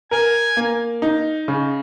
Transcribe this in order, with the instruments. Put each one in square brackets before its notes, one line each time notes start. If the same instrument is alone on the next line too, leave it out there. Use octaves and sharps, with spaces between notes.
[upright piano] A#4 [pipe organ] G#5
[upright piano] A#3
D#4
C#3